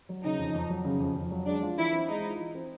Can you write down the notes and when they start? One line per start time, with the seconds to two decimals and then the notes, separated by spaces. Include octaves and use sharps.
0.09 F#3
0.23 C#3 D#4
0.39 F2
0.54 F2
0.70 F#3
0.85 C#3
1.00 F2
1.16 F2
1.31 F#3
1.46 G#3 D4
1.63 F4
1.78 E3 E4
1.93 C4
2.08 G#3 D#4
2.24 F4
2.39 E3
2.55 C4